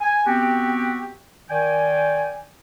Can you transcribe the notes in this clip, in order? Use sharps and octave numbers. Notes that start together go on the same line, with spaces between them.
G#5
B3 C4 F#4 G4
D#3 D5 G5 G#5